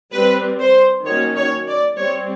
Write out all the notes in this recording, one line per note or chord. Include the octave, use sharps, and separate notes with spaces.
G3 C4 B4
C5
D#3 F#3 A#3 C#4 C#5
C#5
D5
G3 C4 C#5